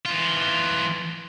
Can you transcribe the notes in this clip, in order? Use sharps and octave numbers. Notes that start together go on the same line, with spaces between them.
E3 F4